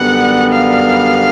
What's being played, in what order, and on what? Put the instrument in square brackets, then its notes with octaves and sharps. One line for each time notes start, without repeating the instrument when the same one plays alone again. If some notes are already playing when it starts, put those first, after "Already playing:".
Already playing: [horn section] F#2 D3 G3 B3 [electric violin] F#5
[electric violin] F5